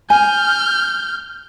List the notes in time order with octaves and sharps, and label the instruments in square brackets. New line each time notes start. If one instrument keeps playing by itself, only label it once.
[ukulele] G#5 [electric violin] F6 G6